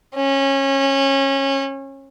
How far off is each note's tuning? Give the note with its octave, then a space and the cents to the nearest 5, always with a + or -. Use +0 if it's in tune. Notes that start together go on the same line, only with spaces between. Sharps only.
C#4 -25